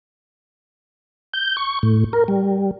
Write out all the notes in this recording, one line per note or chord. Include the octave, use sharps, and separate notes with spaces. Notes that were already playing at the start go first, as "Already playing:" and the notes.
G6
C#6
A2
A#4
G3